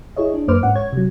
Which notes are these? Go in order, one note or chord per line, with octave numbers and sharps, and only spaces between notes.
E4 G#4 C#5 D#5
D4
F#2 A#3 B4 C5 D6 F6
G#2 C#4 F#5
C#5 G#6
C3 F#3